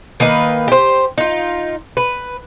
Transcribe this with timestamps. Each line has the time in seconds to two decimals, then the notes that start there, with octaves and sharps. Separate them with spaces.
0.20 D#3 A#3 D#4 B4
0.68 G4 C5
1.18 D#4 F4
1.97 B4